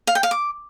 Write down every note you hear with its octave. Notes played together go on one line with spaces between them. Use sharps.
F5
G5
F5
D6